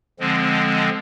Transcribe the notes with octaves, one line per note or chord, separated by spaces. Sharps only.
D3 F3 G#3 C4